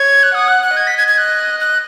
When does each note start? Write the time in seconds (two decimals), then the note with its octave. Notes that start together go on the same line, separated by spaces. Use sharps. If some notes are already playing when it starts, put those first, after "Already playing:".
Already playing: C#5 G#6
0.23 F#6
0.34 F#5 D#6
0.48 F#6
0.63 F#6
0.76 D#5 G#6
0.87 B6
0.97 G#6
1.08 G#6
1.18 F#6
1.60 F#6